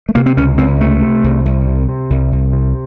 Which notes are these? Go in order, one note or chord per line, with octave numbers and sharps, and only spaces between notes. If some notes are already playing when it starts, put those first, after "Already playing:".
A3
C3 A#3
C4
C#2 C#4
C#2 C4
C3 A3
C3
C2
C2
C3
C3
C2
C2
C3